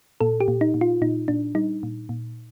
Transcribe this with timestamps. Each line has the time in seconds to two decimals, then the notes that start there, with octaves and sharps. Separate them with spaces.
0.21 A#2 A4
0.40 G4
0.48 A#2
0.61 D#4
0.74 A#2
0.81 F4
1.02 A#2 D#4
1.28 A#2 D4
1.55 G3 D#4
1.83 A#2
2.09 A#2